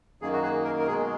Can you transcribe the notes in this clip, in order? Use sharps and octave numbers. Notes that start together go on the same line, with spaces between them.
F#2 D#3 A#3 G#4
F#4
G#4
A#4
A#4
B2 G#3 G#4